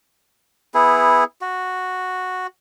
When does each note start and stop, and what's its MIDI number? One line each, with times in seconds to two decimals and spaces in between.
0.74 1.24 59
0.74 1.24 64
0.74 1.24 68
1.41 2.47 66